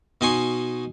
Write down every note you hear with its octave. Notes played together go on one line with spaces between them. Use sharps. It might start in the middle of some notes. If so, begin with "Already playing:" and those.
B2 D#4 G#5 C6 C#6